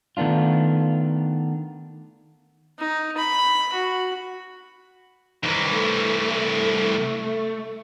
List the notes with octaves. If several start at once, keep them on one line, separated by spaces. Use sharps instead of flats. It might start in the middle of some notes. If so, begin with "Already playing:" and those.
D#3 A3 B3 D4 F4
D#4
B5
F#4
C2 D#3 E3 A#4
A3